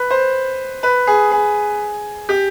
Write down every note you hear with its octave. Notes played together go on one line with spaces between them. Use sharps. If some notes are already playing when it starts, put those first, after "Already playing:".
Already playing: B4
C5
B4
G#4
G#4
G4